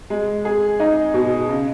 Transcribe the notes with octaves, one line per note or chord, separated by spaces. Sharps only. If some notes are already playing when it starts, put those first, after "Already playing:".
G#3
G#4
D#4
B2
C#3